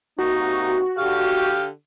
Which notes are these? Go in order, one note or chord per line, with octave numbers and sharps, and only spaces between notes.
C3 A#3 D#4 F#4
D3 G4 F5